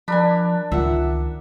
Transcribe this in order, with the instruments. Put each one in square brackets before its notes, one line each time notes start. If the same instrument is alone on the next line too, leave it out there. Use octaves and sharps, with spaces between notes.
[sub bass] F3 [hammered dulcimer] D4 A#4 [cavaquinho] G#5 B5
[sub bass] C#2 [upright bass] D#3 F4 [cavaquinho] E5 F#5